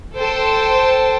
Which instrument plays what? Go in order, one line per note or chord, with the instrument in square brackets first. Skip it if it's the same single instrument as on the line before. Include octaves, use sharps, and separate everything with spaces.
[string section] A4 C5 G5 A5